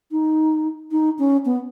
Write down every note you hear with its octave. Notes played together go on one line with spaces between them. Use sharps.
D#4
D#4
C#4
B3